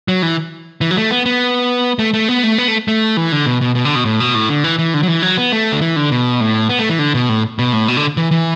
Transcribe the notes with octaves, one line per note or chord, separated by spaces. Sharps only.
F#3
E3
E3
F#3
A3
B3
B3
A3
A3
B3
A3
B3
A3
A3
E3
D3
B2
B2
B2
D3
B2
A2
B2
A2
D3
E3
E3
D3
F#3
E3
F#3
B3
A3
D3
E3
D3
B2
A2
B3
A3
E3
D3
B2
A2
B2
A2
B2
D3
E3
E3